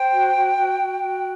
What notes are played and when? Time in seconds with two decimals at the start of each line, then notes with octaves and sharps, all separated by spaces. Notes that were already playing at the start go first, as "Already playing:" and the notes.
Already playing: C5 G5
0.11 F#4
0.34 F#4
0.57 F#4
0.80 F#4
1.01 F#4